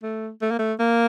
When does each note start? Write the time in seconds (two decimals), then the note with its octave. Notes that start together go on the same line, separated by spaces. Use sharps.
0.03 A3
0.42 A3
0.51 A#3
0.59 A3
0.80 A#3